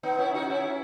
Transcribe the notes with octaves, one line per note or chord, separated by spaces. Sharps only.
B3 D#4
C#4 E4
D#4 F#4
C#4 E4